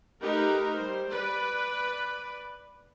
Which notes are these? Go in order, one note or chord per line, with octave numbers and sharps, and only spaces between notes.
A3 D#4 G4 A#4 B4
G3 C5
B4 D5